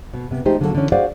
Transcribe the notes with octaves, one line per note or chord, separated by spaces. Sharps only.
B2
C3 B3
F3 G#3 A3 D#4 G4 C5
D3 F#3 A#3 B3 F#4 A4
D3 E3 C#4
F#4 G#4 C5 D5 F5 F#5